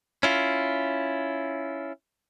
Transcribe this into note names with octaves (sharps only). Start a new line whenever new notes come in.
C#4 E4 F4